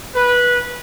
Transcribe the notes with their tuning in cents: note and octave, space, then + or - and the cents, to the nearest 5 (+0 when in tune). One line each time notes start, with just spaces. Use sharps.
B4 -15